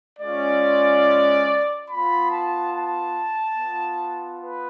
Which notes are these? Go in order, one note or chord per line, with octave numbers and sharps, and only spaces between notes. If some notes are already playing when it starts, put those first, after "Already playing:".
G#3 C#4 F4 D5
B3 F4 B5
A5
A5
B3 F4
B4